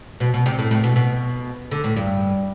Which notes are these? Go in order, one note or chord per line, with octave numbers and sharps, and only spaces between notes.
B2
B2
C3
A2
A2
B2
B2
D3
A2
G2